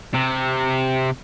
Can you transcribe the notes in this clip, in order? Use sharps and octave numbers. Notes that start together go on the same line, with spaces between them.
C3